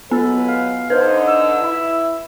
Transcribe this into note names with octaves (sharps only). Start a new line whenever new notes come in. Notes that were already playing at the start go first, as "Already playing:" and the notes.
F#3 G#3 B3 A4 B4
F5
D3 D#4 B4 C5
E6
E4